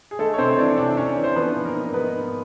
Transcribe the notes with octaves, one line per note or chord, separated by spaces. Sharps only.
G#4
G#3 A3 A4
C#5
C3 C4 C5
C#5
E3 D4 D5
C#5
C3 D4 D5
C3 C#4 C#5
E3
C5
F3 B3 B4
G#2
A#3 A#4
G#2
A#4
G#3 B3 B4
G#2